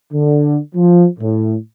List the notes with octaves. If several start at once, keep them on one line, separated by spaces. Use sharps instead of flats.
D3
F3
A2